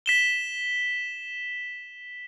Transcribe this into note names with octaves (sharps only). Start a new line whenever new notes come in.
B6 E7 G7